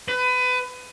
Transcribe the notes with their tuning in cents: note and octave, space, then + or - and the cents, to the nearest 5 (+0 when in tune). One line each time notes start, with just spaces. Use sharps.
B4 +25